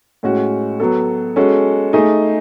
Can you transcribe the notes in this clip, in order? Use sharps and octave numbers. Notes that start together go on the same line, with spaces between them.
A2 G#3 C#4 F#4
F#3 B3 F#4 A4
G#3 C#4 F#4 A4
A3 D#4 G#4 D#5